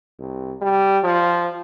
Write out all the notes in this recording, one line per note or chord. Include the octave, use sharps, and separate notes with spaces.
C2
G3
F3